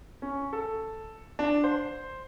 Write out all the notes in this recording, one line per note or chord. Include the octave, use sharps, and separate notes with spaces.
C#4
A4
D4
C5